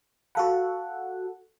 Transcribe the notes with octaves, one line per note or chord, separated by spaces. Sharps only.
F#4 A4 F5 F#5 A5 B5